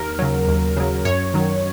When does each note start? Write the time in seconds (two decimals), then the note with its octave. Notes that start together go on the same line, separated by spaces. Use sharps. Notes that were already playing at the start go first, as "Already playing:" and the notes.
Already playing: D#2 A#4
0.19 C#3 F#3
0.48 D#2
0.77 C#3 F#3
1.05 F#2 C#5
1.34 D#3 F#3